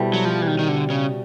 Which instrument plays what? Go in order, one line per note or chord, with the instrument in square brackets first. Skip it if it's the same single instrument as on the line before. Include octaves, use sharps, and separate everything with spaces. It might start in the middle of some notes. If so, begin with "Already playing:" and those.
Already playing: [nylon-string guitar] B2 G3 C4 E4 A4
[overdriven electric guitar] F#3
F3
E3
D#3
D#3
D3
C#3